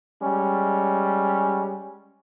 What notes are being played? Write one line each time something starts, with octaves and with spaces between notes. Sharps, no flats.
G3 G#3 C#4